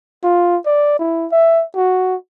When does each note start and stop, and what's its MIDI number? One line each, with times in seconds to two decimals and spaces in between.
0.23 0.57 65
0.66 0.99 74
0.99 1.26 64
1.32 1.64 76
1.75 2.15 66